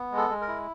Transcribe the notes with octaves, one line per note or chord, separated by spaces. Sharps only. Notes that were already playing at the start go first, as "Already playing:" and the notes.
Already playing: B3
G#3
A4
G#3
A#4
E4